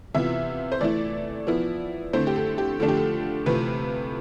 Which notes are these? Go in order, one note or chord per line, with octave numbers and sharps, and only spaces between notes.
C3 E3 B3 F4 E5
C5
E3 A3 E4 D5
F3 B3 E4
D3 A3 C4 E4 C5
G4
A4
G4
D3 F3 A3 D4 F4 A4
G4
A4
C3 E3 A3 C4 F4 B4